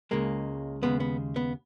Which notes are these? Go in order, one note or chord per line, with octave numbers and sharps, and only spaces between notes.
C#2 C#3 G#3 A#3
D#2 C#3 G#3 B3
B3
B3